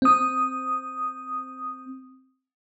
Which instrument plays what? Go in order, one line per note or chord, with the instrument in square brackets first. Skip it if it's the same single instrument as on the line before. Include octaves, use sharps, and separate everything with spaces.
[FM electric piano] C4 D#6